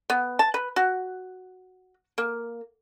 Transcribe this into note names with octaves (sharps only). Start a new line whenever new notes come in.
B3
A5
B4
F#4
A#3